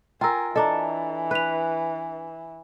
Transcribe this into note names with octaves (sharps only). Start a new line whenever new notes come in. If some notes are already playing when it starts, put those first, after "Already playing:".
F4 A#4 G5 G#5 A#5 E6
E3 D4 A4 D#5 A#5
B4 F#6 F7